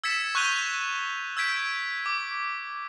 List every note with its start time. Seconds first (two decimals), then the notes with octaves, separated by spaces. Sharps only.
0.04 E6 G#6 A6 B6 C#7 E7
0.35 C#6 F#6 G6 D#7 F7 G7
1.37 E6 G6 G#6 B6 D7
2.06 D6